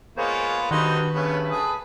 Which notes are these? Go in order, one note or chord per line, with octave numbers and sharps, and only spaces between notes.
G#3 A#3 B3 F4 C5 C#5
G2 D3 D#3 D#4 F#4 B4 C5
G2 C#3 A3 B3 C#4
G#4 A4 D#6